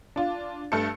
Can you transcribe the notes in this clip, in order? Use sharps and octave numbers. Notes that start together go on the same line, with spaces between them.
D4 F4
G2 A3 A4 C#7